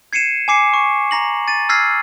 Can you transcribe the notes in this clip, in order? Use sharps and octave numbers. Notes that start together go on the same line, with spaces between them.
G#6 C7 C#7 D#7 E7
G#5 D6 C7 C#7
C#6
A#5 A#6 F#7
A6 D#7
E6 F6 G#6 A#6 C7